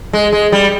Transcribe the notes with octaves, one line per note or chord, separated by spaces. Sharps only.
G#3
G#3
G3